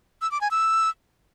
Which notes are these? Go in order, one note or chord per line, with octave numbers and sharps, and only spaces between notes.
E6
D6
G#5
E6